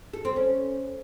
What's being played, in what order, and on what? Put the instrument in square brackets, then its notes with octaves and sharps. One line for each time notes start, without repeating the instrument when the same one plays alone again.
[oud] A4
C4
C#4